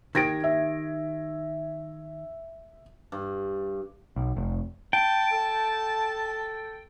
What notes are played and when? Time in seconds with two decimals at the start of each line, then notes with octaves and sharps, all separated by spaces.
0.15 D#3 G4 G#6 A#6 D7
0.44 E5
3.12 G2
4.16 B1
4.37 F1
4.93 G5 A5
5.32 A4